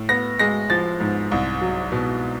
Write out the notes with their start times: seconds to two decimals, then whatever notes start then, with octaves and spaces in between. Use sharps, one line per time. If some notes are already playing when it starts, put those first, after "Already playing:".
Already playing: A2
0.09 B3 A#6
0.39 G#3 A#6
0.70 F3 A6
1.00 G#2
1.31 C2
1.61 F#3
1.92 B2